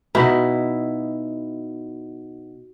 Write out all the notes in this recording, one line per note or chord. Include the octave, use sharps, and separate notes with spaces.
B2 D#4 E4